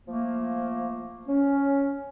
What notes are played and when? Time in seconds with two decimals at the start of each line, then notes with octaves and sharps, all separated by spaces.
0.07 F3 A3 A#3
1.27 C#4